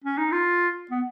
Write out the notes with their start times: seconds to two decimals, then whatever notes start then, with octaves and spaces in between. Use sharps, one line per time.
0.04 C#4
0.18 D#4
0.32 F4
0.91 B3